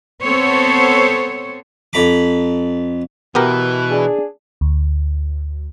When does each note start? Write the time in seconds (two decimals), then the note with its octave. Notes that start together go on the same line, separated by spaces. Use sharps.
0.21 B3 C4 A4 C5 C#5
1.93 F2 A#5 B5 D6
3.35 B2 E3 B3 G4 A#4
3.90 D4 G#4
4.61 D2